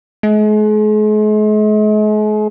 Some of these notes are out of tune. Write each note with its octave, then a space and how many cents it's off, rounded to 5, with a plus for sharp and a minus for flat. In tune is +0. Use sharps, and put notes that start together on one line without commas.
G#3 +40